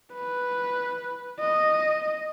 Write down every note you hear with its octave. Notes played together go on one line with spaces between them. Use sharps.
B4
D#5